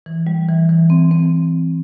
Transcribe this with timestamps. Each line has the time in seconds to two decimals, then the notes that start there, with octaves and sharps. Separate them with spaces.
0.06 E3
0.27 G3
0.48 E3
0.69 E3
0.90 C4
1.11 C4